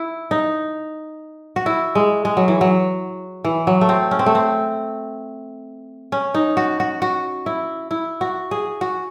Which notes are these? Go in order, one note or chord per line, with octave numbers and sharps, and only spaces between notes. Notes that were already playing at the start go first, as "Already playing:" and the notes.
Already playing: E4
D#4
F#4
E4
G#3
G#3
F#3
E3
F#3
E3
F#3
A3
C4
C#4
C4
A3
C4
C#4
D#4
F#4
F#4
F#4
E4
E4
F#4
G#4
F#4